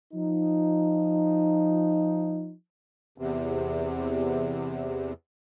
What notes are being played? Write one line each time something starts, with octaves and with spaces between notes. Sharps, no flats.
F3 D#4
E2 C3